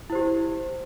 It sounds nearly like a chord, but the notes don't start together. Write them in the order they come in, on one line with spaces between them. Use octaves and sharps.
E4 C5 G4